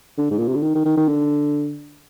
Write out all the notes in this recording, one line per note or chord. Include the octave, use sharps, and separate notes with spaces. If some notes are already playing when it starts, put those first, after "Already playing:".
D3
G#2
A#2
C3
D3
D#3
D#3
D#3
D#3
D3